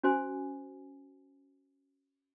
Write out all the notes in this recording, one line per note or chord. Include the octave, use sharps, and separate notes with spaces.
C#4 F#4 C5 G#5